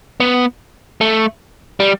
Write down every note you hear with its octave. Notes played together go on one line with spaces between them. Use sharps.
B3
A3
G3